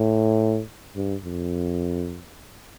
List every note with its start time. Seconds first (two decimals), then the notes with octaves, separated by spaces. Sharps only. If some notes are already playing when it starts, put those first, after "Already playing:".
Already playing: A2
0.96 G2
1.24 F2